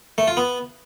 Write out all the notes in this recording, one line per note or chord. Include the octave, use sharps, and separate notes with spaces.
A3
F4
B3